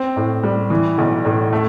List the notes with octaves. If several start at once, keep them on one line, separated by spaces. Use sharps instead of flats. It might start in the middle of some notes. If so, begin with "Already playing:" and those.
Already playing: C4
A2
G3
E3
B1
A2
A3